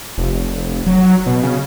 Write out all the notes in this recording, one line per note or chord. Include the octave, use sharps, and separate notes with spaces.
F1
F#3
B2
C#3